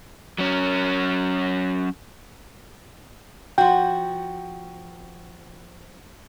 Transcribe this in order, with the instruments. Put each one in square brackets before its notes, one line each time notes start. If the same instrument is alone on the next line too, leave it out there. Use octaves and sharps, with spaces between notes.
[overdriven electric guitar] F#3 C#4
[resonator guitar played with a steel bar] F3 F#4 [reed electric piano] G5